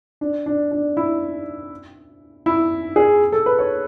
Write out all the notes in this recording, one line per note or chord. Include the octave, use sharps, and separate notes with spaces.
D4
D4
D4
E4
E4
G#4
A4
B4
C#5